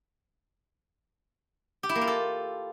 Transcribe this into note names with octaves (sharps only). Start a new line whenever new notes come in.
G4
E4
A#3
F4
A4